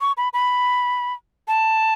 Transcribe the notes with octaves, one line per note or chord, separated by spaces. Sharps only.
C#6
B5
B5
A5